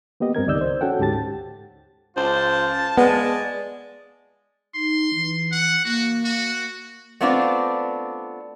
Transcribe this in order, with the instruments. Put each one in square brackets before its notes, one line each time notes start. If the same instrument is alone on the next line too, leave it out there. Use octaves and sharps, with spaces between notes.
[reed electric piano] A#3 B3 G4 D#5
G2 C4 A#4 G#6
C#2 D#3 D5 D#5 E6 G6
C5
C#4 F#4 A4 F#5 G5
D2 G#2 G4 A5 A6
[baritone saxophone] C#2 [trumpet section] F4 A5 [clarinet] C5
[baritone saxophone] G#3 [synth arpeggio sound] B3 [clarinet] D5
[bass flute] D#4 [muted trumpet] C6
[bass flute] E3
[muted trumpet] F#5
[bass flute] A#3 [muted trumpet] F#4
[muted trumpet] F#4
[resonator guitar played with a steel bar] A3 B3 C4 D4 F4 D5